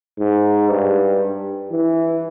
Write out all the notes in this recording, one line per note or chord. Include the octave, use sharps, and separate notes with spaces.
G#2
G2
E3